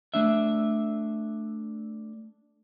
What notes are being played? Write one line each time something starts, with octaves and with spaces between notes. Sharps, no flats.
A3 D4 E5